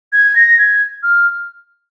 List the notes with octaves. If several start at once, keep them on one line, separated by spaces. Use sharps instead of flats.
G#6
A#6
G#6
F6